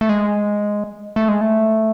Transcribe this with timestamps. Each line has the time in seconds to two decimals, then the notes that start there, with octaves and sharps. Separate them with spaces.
0.01 A3
0.09 G#3
1.16 A3
1.29 G#3
1.41 A3